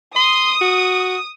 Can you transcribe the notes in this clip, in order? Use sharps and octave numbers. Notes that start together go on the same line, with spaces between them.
C6 D#6
F#4